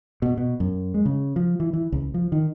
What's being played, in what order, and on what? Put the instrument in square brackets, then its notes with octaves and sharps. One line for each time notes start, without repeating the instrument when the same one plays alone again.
[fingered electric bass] B2
B2
F#2
G#3
C#3
F3
E3
E3
C#2
F3
D#3